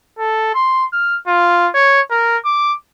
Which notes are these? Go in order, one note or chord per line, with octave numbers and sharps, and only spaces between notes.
A4
C6
F6
F4
C#5
A#4
D6